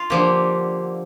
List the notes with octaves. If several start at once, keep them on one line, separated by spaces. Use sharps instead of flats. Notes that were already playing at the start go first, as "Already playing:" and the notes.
Already playing: F4
D3 F3 A#3 G4